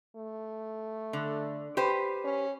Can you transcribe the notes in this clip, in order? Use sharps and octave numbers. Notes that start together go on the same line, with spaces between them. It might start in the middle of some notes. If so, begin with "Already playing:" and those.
A3
D3
G4 B4 C5
C#4